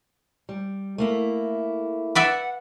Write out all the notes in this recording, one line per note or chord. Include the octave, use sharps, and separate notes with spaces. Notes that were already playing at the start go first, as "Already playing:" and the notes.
G3
A3 A#3 E4
B4 D5 E5 F#5